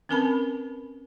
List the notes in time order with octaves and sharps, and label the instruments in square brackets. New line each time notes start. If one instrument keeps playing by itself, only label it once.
[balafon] C4 C#4 A#4 B4 A5 B5